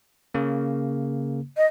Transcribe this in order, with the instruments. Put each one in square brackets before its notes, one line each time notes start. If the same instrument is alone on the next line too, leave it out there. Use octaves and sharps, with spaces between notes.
[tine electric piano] C#3 A#3
[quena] D#5